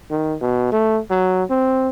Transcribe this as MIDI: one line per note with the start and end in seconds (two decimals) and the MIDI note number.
0.10 0.35 51
0.41 0.70 47
0.72 1.00 57
1.10 1.44 54
1.50 1.89 60